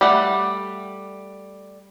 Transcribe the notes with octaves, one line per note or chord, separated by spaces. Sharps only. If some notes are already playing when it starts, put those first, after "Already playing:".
G3 A3 D5 F#5